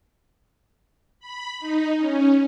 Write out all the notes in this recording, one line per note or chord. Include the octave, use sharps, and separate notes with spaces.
B5
D#4
C#4